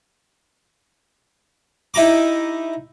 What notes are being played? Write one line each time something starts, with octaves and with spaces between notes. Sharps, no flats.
D#4 E4 G4 A#5 D6